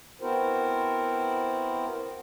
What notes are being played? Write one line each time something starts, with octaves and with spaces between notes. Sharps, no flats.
B3 C4 E4 F#4 A#4 C5